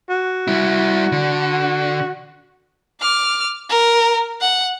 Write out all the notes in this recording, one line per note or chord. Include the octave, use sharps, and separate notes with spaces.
F#4
G3 E4
D3
D6 F6
A#4
F#5